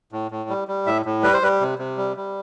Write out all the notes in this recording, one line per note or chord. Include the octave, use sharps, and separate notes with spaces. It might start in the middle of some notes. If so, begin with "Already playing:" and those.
A2
A2
G3
G3
A2 E5
A2
G3 B4
C5
G3 B4
C3
C3
G3
G3